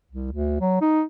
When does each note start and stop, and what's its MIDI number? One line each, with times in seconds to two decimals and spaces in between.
0.11 0.32 36
0.32 0.58 38
0.61 0.79 54
0.81 1.03 63